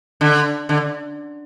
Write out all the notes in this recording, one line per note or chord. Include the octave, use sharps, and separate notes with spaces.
D3
D3